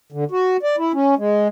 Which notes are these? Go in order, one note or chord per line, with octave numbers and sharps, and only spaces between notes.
D3
F#4
D5
E4
C#4
G#3